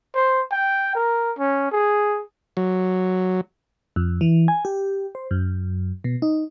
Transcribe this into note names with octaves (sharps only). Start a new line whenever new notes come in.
C5
G5
A#4
C#4
G#4
F#3
F2
E3
G#5
G4
C5
F#2
B2
D#4